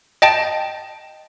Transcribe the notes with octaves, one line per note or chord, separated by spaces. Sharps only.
D#5 G5 A5